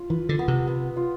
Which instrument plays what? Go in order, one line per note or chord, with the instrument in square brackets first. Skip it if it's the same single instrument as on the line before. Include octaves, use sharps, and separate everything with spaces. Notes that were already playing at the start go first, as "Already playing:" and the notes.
Already playing: [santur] F4
[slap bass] E3 [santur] B4
[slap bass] D3
[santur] B3
[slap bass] C3
[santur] B3
F4